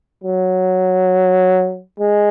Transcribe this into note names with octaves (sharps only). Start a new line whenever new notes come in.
F#3
G#3